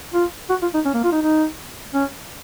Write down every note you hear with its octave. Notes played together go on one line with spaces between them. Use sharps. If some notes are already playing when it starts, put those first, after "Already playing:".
F4
F#4
F4
D#4
C#4
A#3
F4
D#4
D#4
C#4